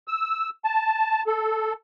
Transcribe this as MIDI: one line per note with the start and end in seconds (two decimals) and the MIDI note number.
0.08 0.49 88
0.65 1.22 81
1.27 1.73 69